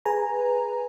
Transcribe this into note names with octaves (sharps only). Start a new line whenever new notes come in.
G#4 B4 G#5 A#5